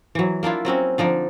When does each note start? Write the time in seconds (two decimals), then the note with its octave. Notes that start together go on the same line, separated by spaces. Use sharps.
0.15 E3 F#3
0.43 A#3 D4 E4 F4
0.65 F#3 C4 C#4 F#4
0.98 D3 F3 D#4 D5